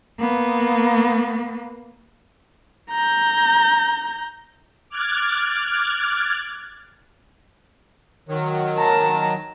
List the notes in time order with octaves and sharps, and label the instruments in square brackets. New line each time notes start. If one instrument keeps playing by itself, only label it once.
[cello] A#3 B3
[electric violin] A#5 G6
[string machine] D6 F6 F#6 G#6 A6
[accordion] D#3 F#3
[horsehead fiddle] A5 A#5